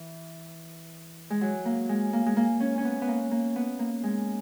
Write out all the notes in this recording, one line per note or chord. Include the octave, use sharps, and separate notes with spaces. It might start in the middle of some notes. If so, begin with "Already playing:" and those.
Already playing: E3
G#3
F#3
A#3
G#3
A#3
G#3
A#3
C#4
C#4
B3
B3
A#3
A#3
B3
A#3
G#3